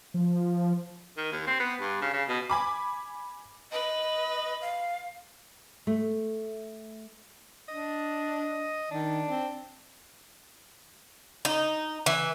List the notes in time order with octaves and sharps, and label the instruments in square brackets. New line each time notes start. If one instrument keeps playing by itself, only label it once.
[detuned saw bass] F3
[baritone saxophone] D#3
D#2
C4
B3
G2
C#3
C#3
B2
[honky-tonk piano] G#5 B5 D6
[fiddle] B4 [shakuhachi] D#5
[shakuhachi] F5
[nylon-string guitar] A3
[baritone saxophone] D4 [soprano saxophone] D#5
[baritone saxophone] D#3 [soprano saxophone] D4
[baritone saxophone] C4
[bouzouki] D#4
E3